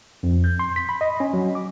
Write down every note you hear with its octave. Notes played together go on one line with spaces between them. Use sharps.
F2
G6
C6
B6
B5
D#5
C#4
F#3
D6